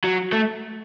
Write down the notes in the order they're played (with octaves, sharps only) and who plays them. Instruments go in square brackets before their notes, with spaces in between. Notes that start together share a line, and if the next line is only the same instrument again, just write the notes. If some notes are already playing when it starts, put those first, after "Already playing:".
[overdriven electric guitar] F#3
A3